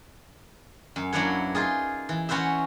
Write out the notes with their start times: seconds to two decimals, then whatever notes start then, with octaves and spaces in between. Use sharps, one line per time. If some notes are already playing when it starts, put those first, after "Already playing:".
0.96 F#2
1.13 F#3 A#3 D4 E4 B4 C#5
1.55 D#4 F4 G#4
2.09 E3
2.29 E3 C#4 F#4 B4 C5 E5